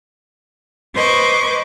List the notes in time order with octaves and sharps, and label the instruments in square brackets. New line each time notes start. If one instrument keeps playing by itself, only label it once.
[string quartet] B4 C5 D#5 C#6 D6 G#6